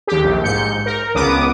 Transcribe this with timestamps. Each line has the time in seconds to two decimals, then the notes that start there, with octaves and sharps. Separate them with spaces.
0.07 D#2 G4
0.25 A#1
0.44 G#2 G6 C#7
0.86 A#4
1.15 C#2 B3 D6 D#6